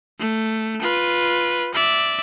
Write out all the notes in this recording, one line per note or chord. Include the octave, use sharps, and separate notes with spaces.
A3
F4 B4
D5 E5